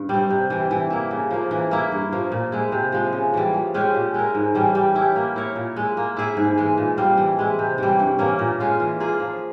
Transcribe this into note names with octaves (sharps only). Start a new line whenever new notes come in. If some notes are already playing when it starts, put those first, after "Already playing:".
Already playing: G2
G3 C4
C3
E3 G3
E3
A#3 E4
C#3
F3 A#3
E3
A#3 E4
G2
F3 A#3
A#2
G#3 E4
C3
F3 G#3
C#3
E3 G3
F3
G#3 C#4 G4
A#2
G#3 E4 A#4
G#2
E3 G3 C#4
G3
C#4 E4 G4
A#3
E4 A#4 C#5
A#2
G#3 E4
A#3
E4 G#4 E5
G#2
E3 G#3
A#2
G3 C4 F4
E3
G#3 E4
C3
E3 G3
G2
E3 A#3 C#4
A#2
G#3 C#4 F4
E3
A#3 F4 G#4
F3